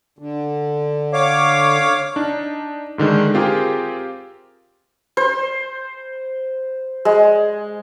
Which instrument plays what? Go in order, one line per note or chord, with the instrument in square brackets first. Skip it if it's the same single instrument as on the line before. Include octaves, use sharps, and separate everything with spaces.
[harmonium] D3
[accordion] C#5 F5 D6
[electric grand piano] D4 D#4
G#2 D3 D#3 G#3
C4 F4 G4 G#4 A#4
[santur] C5
G#3